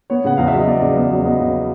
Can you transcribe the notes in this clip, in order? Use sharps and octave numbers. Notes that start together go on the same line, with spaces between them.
B3 C#5
C#3 F#5
E2 F5
E5
F#3
D#5
B3 D5
C#3
E2
F#3
B3 D#5
C#3